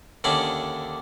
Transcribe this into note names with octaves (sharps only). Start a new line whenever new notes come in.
D#2 D3 C#4 D4